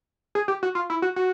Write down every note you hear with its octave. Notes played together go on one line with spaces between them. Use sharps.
G#4
G4
F#4
F4
E4
F#4
F#4